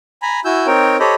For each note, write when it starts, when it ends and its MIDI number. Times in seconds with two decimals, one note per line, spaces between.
0.22 0.40 80
0.22 0.40 82
0.22 0.40 83
0.45 0.67 64
0.45 0.67 66
0.45 0.67 80
0.45 0.67 88
0.45 0.67 91
0.67 0.97 60
0.67 0.97 63
0.67 0.97 70
0.67 0.97 73
0.67 0.97 79
1.00 1.15 67
1.00 1.15 69
1.00 1.15 72
1.00 1.15 73
1.00 1.15 75
1.00 1.15 83